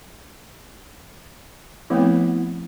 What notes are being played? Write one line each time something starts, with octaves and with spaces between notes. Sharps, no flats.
F3 A3 B3 C4 E4